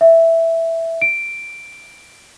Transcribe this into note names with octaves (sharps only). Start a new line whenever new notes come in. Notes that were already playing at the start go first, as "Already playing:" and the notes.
E5
D7